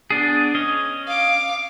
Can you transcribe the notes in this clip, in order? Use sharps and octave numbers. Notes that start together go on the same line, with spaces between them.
B3 D4 G#4
C#4 D#5
F5 D6